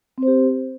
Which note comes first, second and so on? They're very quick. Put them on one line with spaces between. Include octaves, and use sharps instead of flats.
C4 C5 G4